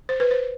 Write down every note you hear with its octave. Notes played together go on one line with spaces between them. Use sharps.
C5
B4
C5